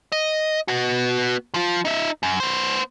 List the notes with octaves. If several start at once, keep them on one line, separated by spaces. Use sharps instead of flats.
D#5
B3 F#4
F3 F4
D#4 E5
F#2
B3 C5